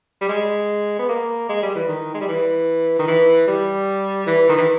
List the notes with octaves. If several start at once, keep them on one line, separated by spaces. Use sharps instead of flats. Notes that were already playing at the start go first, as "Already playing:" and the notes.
G3
G#3
B3
A#3
G#3
G3
E3
D#3
G#3
G3
E3
D#3
E3
G3
E3
D#3
E3